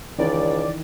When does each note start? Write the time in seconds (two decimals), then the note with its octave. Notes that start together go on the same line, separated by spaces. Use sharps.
0.18 C#2 D#3 E3 D5